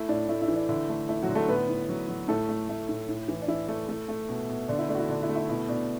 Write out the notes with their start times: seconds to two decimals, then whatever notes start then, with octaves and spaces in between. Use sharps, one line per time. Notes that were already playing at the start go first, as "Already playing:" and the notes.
Already playing: A3 E4
0.09 A2 D4
0.28 A3 E4
0.42 E4
0.48 E3
0.56 D4
0.69 D3 E4
0.89 A3
1.09 A3 E4
1.22 F#3 F#4
1.29 D3
1.35 A3 A4
1.48 A2 B3 B4
1.69 A2
1.89 F#3
2.08 F#3
2.28 A2 A3 A4
2.49 A3
2.69 A3
2.89 A2
3.09 A2
3.28 E3
3.42 D4
3.48 E3 E4
3.68 A3
3.89 A3
4.09 A3
4.29 B2
4.49 B2
4.68 D3 D4
4.79 E4
4.89 A3 D4
4.95 F#4
4.99 E4
5.09 D3 D4
5.23 E4
5.29 A3
5.36 E4
5.49 B2 E4
5.68 B2 D4